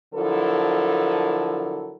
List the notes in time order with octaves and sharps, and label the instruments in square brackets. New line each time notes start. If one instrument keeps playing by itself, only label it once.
[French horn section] D3 F3 F#3 E4 A4 A#4